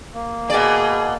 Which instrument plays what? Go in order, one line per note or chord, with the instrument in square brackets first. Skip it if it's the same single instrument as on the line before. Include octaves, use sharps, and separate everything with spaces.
[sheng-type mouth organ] A#3
[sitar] B2 D5 [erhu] G#4